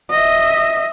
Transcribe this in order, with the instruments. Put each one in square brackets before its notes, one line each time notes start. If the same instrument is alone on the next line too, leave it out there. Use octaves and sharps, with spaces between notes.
[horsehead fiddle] D#5 E5